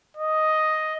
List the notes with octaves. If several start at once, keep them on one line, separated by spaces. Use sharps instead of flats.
D#5